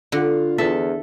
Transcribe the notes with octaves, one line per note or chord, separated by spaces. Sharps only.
D3 F4
E2 A4 E5